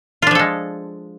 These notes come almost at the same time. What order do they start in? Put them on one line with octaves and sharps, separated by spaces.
F4 D4 F3 A4 G#3